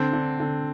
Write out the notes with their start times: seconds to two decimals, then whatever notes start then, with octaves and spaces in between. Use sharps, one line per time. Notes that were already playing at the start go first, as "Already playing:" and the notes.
Already playing: D3 C4
0.13 D3
0.40 D3